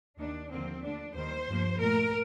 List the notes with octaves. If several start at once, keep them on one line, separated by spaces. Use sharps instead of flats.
D#2 D#3 A#3 D4
D#2 D3 F3 A#3 C4
D2 D3 F3 D4
D#2 D#3 G3 C5
G2 F3 A#3
A#2 A3 A#4